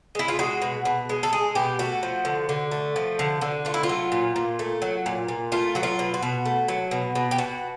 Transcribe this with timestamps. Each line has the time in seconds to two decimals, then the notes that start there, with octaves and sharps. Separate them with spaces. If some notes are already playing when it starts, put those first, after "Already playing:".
0.15 G#3 E4
0.28 F4
0.39 G#3 F#4
0.62 B2
0.85 B2
1.09 G#3
1.23 A4
1.33 G#3 G#4
1.55 B2 G4
1.79 A3 F#4
2.03 F3
2.25 D3
2.49 D3
2.71 A3
2.96 F3
3.19 D3
3.41 D3
3.65 A3 F4
3.74 E4
3.83 F4
3.89 F#3
4.12 A#2
4.36 A#2
4.59 A3
4.82 F#3
5.06 A#2
5.28 A#2
5.52 A3 F4
5.75 F#3 F#4
5.83 F4
5.99 B2
6.14 F#4
6.23 B2
6.45 A3
6.68 F#3
6.91 B2
7.15 B2
7.31 G4
7.38 B2 F#4